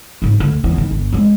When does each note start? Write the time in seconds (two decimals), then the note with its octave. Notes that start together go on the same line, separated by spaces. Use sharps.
0.22 G#2 F#3
0.40 D2
0.64 E2 E3
0.78 D#3
0.91 G1
1.13 G#3 C#4